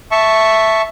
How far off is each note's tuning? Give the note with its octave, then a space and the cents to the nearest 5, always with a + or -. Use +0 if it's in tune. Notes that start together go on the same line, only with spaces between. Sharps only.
E5 +0 A5 +0 C#6 +0